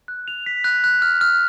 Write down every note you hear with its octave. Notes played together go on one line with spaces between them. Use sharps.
F#6
F7
B6
F#6
F#6
F6
F6